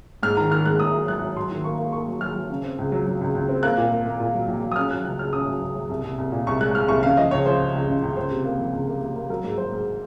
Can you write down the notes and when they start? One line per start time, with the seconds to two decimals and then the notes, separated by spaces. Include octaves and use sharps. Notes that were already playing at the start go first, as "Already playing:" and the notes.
0.23 G#2 F6
0.37 D#3 A#5
0.51 D#3 F6
0.65 G#2 F#6
0.80 G#2 D#6
0.94 F#3
1.08 F#3 F#6
1.23 F#3
1.36 F#3 C6
1.51 D#3
1.64 A#3 C#6
1.78 A#3
1.93 A#3 C#6
2.07 F#3
2.21 F#3 F6
2.35 F#3
2.50 C#3
2.64 C4
2.78 C#2
2.92 F#3
3.07 F#3
3.21 C#2
3.35 C#2
3.49 C4
3.63 A#3 F#6
3.77 A#2
3.91 A#3
4.06 A#3
4.20 A#2
4.34 F#3
4.48 A#1
4.62 F#3
4.72 D#6
4.76 C#4 F6
4.90 F#3 F#6
5.05 C#2 F#6
5.19 C#2 F6
5.33 C#4 D#6
5.48 F#3
5.61 C#2
5.75 F#3
5.90 C2
6.04 C2
6.18 C2
6.32 A#2
6.47 C2 C#6
6.60 G#3 F#6
6.75 G#3 F6
6.88 C2 C#6
7.03 C#3 F5
7.17 F3 D#5
7.31 C#2 C#5
7.46 F3 C5
7.59 C#3
7.74 C#2
7.88 C#3
8.02 C#2
8.16 C#2 C5
8.31 C3
8.45 A#3
8.59 F3
8.73 C#2
8.88 A#3
9.01 A#3
9.16 A#3
9.30 F#3 A#4
9.44 G#2
9.58 F#3 C5
9.72 G#2